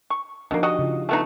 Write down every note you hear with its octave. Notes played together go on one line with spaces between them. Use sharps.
C#6
B2 F3 A#3 D4 D#4
F#4 G4 D#5
C#3 F4
A3 B3 D#4